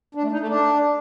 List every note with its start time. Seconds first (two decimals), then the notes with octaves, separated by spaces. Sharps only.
0.15 D4
0.23 A3
0.31 D#4
0.40 A3
0.48 D4